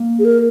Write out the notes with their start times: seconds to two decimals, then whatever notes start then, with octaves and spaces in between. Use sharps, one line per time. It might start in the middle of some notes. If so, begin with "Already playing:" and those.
Already playing: A#3
0.19 G#4
0.25 A#4